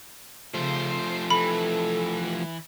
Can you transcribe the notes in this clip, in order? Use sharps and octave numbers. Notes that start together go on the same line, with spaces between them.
C#3 F3 A3 C5
E3 A4 B5